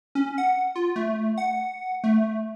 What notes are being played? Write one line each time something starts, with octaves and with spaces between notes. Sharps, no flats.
C#4
F#5
F4
A3
F#5
A3